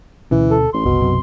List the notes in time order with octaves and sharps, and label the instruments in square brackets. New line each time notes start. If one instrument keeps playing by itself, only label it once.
[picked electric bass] D2 B2 C#4 [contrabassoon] E3
[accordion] A4
[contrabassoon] A1 [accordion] C6
[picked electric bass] F#1 C2 [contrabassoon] B2
[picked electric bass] B1 F#2 C3